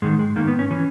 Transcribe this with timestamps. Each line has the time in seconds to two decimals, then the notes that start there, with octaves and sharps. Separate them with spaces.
0.02 G#2 D#3 G#3
0.19 G#3
0.36 G#2 D#3 A#3
0.48 B3
0.59 C#4
0.71 E3 C#4